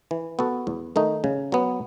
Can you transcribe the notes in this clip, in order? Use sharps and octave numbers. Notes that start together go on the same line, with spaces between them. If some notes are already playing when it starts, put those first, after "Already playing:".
E3
B3 F#4 A4
E2
D#3 A3 D#4
C#3
F#3 B3